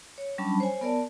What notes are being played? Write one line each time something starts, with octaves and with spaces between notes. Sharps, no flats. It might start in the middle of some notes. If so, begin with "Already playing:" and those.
C#5
F#3 G3 C#4 D4 A5 B5
C5 C#5 G#5
B3 A#4 D5 A5